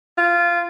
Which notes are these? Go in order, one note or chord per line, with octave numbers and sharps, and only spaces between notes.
F4